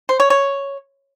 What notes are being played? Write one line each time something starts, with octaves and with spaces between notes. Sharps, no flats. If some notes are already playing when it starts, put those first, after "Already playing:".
C5
C#5
C#5